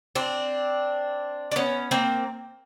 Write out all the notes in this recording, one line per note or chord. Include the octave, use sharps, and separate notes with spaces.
C4 D4
D4
B3 C#4
A#3 C4